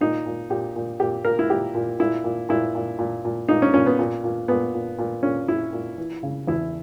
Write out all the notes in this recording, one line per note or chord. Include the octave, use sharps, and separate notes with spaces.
A#2 D#4
A#2
A#2 G4
A#2
A#2 G4
A#2 A#4
E4
A#2 G4
A#2
A#2 E4
A#2
A#2 E4
A#2
A#2
A#2
A#2 D#4
C#4
A#2 C#4
B3
A#2
A#2
A#2 B3
A#2
A#2
A#2 C#4
A#2 E4
A#2
E3
C#3
E2 E4